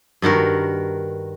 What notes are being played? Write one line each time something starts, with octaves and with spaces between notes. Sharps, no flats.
G2 D#3 F#4 A#4